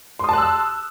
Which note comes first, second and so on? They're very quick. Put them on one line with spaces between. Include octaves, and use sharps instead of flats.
C6 D#6 A5 F#6 E6